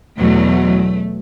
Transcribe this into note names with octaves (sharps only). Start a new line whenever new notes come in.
E2 B2 F#3 A3